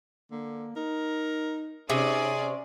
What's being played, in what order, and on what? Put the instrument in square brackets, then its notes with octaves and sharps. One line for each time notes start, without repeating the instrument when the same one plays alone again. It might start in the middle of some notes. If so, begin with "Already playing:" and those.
[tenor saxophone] D3 [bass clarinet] A#3
[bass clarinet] D#4 [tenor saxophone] A#4
[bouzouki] C3 [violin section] C#4 D5 [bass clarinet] D#4 [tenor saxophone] G#4